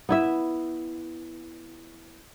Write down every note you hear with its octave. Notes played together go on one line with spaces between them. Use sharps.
B3 E4 E5